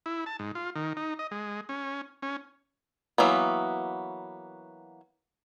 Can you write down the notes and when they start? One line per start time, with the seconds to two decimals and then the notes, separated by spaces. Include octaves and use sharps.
0.06 E4
0.26 A5
0.39 G#2
0.55 F4
0.76 D#3
0.97 D#4
1.19 D#5
1.31 G#3
1.69 C#4
2.22 C#4
3.18 E3 F#3 A#3 B3